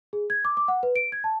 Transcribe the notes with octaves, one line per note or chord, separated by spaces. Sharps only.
G#4
G#6
D6
D6
F#5
B4
D7
G#6
A5